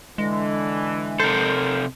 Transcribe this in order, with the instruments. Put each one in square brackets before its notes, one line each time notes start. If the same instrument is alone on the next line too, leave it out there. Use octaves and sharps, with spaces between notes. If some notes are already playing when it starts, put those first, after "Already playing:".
[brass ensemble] D3 E3 [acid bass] G#3
[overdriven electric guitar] C3 A4 [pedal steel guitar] A#4 C5